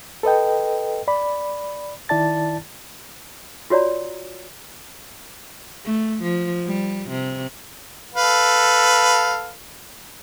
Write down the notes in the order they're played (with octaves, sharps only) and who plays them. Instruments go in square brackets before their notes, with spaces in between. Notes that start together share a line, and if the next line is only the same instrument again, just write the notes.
[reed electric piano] A4 B4 D#5 G5
D5 B5
D#3 E4 D5 A5 A6
[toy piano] F4 F#4 C#5 D5 A#5
[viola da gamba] A3
F3
G3
C3
[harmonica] A4 B4 F5